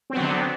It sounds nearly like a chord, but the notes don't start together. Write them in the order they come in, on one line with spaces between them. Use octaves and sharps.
C4 B3 F#3 D3 D4